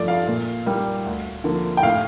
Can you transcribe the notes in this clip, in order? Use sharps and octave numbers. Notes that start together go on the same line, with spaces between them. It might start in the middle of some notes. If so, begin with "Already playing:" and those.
Already playing: G2 F3 A3 D5
F5
A#2
G3 A#3
D2
D3 F3 A#3
G5
A2 F5